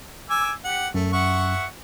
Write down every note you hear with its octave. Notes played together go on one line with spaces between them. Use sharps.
G#5 D6 E6
G4 F#5
F#2 A3
E5 F#5 C#6